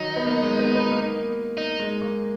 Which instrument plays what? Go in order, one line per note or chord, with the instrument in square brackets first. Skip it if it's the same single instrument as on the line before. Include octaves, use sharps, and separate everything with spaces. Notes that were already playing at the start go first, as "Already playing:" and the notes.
Already playing: [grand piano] D#3 F#3 [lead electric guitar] D#4
[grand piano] B3
A#3
G#3
B3
B3
A#3
[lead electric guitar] D#4
[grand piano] G#3
A#3